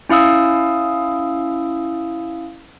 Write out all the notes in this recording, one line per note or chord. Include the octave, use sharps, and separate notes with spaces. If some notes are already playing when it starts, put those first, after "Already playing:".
C#4 E4 F5 D#6 E6